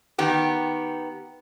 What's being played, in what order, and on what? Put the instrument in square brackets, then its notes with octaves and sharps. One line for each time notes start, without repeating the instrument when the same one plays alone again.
[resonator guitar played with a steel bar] D#3 B3 G4